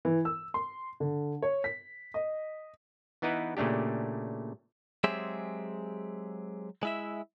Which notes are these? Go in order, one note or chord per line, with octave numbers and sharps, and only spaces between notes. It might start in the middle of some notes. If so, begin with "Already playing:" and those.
E3
E6
C6
D3
C#5
B6
D#5
E3 B3 D#4 E4 B4
A#2 C#3 A3 D4 G4
F#3 G#3 C4 G4 G#4 E5
G#3 E4 E5